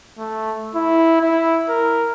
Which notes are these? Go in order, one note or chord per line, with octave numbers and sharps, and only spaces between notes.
A3
E4
E4
A#4